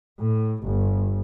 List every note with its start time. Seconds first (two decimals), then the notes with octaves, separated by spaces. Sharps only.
0.19 A2
0.63 G1